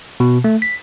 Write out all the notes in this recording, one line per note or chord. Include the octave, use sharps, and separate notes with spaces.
B2
A3
B6